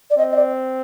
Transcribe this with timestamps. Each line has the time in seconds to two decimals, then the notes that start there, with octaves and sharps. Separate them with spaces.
0.10 D5
0.17 C4 D#5
0.32 D#5
0.36 D5